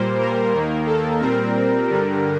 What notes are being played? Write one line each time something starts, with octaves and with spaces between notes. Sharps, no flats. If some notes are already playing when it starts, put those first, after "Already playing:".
Already playing: A#2 G3 A#3 C5
A#4
D#2 D#3 A#3
A4
A#2 G3 C4 A#4
G2 D3 G3